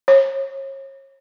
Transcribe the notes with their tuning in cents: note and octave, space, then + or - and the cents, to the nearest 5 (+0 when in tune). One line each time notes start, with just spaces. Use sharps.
C#5 -35